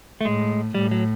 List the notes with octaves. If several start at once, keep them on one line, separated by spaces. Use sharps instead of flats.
A3
A2 G#3
A2 G3
F#3